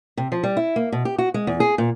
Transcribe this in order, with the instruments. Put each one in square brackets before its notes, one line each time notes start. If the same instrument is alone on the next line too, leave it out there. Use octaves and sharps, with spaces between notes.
[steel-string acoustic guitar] C3
F3
G3
E4
A#3
B2
G4
F#4
G#3
E2
G#4
A#2